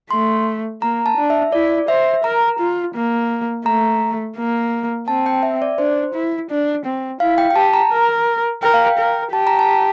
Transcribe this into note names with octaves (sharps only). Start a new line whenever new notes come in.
A3 C6
A#3 A#5
A5
D4
E5
E4 D5
C5 E5
A#4 A#5
F4
A#3
A3 A#5
A#3
C4 A5
G5
E5
D5
D4 C5
E4
D4
C4
E4 F5
G5
G5
G4 A5
A#5
A#4
A#4 G5
F5
G5
A#4
G4 A5
A#5
A5